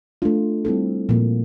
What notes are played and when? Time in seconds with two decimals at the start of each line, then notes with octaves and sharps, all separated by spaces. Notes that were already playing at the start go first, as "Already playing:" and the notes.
0.22 A3 D4 F4
0.65 G3 C4 E4 A4
1.09 A#2 F3 A#3